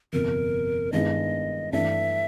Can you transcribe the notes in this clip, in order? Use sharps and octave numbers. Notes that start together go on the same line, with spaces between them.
G1 F2 C3 A#4
G2 D#3 G#3 B3 E4 D#5
G2 E3 A3 D4 E5